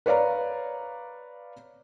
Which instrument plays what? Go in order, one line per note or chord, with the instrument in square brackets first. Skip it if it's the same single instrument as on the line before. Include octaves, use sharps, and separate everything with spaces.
[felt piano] B4 C#5 D5 F5 A#5